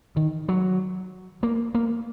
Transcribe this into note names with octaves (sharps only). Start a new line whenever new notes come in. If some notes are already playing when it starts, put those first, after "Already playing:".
D#3
F#3
A#3
A#3